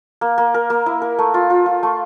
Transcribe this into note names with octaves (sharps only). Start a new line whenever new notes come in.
A#3
A#3
A#4
A#3
E4
A#4
A3
F4
F4
F4
A3